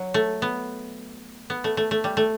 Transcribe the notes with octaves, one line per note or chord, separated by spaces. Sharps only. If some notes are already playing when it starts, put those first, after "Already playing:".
Already playing: F#3
A3
B3
B3
A3
A3
A3
G3
A3